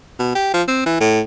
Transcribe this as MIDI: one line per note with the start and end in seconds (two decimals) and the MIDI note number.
0.19 0.35 47
0.35 0.49 67
0.53 0.63 53
0.68 0.84 60
0.86 1.00 52
1.00 1.21 45